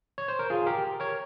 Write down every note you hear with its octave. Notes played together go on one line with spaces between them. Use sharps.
C#5
C5
A#4
F4 G#4
G4 A#4
A#4 C#5